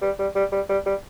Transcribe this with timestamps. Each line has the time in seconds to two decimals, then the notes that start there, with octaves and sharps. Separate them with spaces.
0.02 G3
0.19 G3
0.35 G3
0.52 G3
0.69 G3
0.86 G3